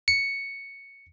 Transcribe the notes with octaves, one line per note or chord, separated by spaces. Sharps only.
C#7